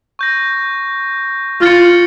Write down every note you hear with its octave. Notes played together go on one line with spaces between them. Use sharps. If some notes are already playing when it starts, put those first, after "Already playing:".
C#6 G6 A#6
F4 F6 A6 C#7